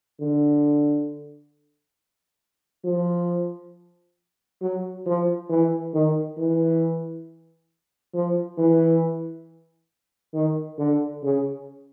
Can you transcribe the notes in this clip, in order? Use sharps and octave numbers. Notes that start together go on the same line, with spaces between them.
D3
F3
F#3
F3
E3
D#3
E3
F3
E3
D#3
D3
C#3